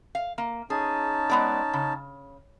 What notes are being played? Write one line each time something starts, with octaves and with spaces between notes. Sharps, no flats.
F5
A#3
C#4 D#4 G#4 A5
G#3 B3 D5
C#3